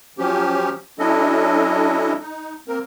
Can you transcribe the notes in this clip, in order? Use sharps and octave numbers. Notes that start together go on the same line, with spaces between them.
F3 F#3 C#4 G4
F#3 C#4 D4 E4 A4 D#5
D#4
A#3 C4 A#4